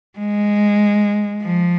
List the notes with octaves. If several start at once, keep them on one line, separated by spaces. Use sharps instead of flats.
G#3
F3